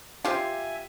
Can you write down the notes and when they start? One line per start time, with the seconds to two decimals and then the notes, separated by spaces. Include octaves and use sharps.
0.25 F4 G4 C5 E5 F5 G#5